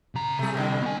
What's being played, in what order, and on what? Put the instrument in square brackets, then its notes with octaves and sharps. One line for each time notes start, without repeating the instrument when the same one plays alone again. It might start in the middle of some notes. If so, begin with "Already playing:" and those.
[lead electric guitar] C#3 A#5
[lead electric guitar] C3 G3 [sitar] A3 G#4
[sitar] A2 D3
[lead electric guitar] B3 G#5